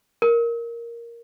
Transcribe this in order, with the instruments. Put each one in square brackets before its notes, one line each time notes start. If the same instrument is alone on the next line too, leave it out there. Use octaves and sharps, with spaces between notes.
[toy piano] A#4